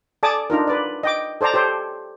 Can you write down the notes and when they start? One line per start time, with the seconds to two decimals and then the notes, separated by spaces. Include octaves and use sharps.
0.23 A4 D5 G#5 A5 D6 D#6
0.50 D4 D#4 F4 A#4
0.67 B4 D5
1.03 D#5 G5 D6
1.41 A4 C5 D5 A5 A#5
1.54 G4 A4 C5 C#5